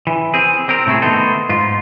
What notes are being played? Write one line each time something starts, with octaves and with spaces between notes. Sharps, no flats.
E3
C4 G#4
C4 A#4
A2 C3 A3 C4 G#4
D#3 A3 B3 D#4 A4 C5
G#2 F4